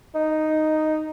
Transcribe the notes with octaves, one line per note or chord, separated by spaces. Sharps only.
D#4